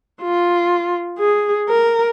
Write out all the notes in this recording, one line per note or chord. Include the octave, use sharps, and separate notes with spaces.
F4
G#4
A#4